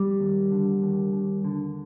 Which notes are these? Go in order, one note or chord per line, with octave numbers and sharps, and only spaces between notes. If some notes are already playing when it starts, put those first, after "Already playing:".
Already playing: G3
D#2
D3
D#2
D#2
D3